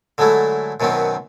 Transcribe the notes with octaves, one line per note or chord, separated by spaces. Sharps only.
D3 F#3 G#3 A3 E4
F#2 B2 D#3 F#3 B3 C4